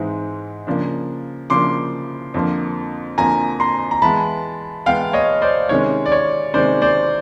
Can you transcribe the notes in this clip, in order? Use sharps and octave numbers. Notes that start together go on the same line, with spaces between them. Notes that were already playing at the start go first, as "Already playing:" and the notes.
Already playing: G#2 E3 G#3 C4 D#4
C#3 F3 A#3 D4
C#3 F3 A#3 D4 C6 D6
F2 D3 F3 A#3
F2 D3 F3 A#3 G#5 A#5
A#5 C6
A#5
E3 G#3 B3 A5 B5
E3 G#3 B3 F5 G5
C#5 D#5
C5 D5
C3 D#3 G#3 C#4 C#5
D5
C#5
C3 D#3 G#3 C#4 C5 D5
C5 D5